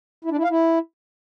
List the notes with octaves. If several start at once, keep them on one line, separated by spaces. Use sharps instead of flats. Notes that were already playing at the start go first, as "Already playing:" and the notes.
E4
D4
E4
F5
E4